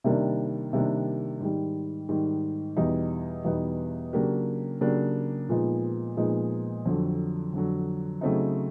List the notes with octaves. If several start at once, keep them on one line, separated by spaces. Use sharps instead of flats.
C3 D#3 G3 A#3 D4
C3 D#3 G3 A#3 D4
G#2 D#3 G3
G#2 D#3 G3
E2 B2 G3 B3 D#4
E2 B2 G3 B3 D#4
C#3 F#3 A#3 D4 G4
C#3 F#3 A#3 D4 G4
A#2 F3 G#3 B3 D#4
A#2 F3 G#3 B3 D#4
F2 D3 F#3
F2 D3 F#3
C#3 F#3 A3 C4 D#4